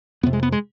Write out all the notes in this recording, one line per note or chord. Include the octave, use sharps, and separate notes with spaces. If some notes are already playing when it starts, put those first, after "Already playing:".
F2 C3 B3
G#3
B3
G#3